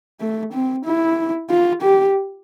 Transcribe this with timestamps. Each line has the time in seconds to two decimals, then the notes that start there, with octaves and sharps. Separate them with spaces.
0.21 A3
0.54 C4
0.85 E4
1.50 F4
1.83 G4